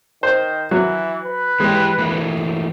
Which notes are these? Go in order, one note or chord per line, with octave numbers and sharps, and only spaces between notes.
D#3 C5
E3 F#3
B4
E3 G#3 G4
E3 A3 A#3